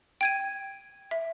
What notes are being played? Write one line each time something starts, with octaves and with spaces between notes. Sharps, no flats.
G5 G#6 D#7
E5